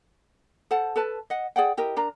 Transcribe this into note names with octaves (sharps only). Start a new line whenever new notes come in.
A4 C5 F#5 A5
A4 B4 A5
D#5 F#5
G#4 D5 F#5 G5
E4 G4 A#4 D#5
D4 A#4 A#5